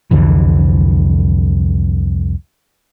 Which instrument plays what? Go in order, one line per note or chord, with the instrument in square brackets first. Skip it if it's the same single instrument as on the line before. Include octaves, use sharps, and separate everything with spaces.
[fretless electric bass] C2 F2 D3 E3